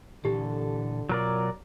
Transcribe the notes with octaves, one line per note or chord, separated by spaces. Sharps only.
A#2 D3 E3 G4 A4
B2 F#3 F4 A#4 D5